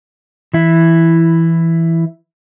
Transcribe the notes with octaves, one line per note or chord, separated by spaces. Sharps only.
E3 E4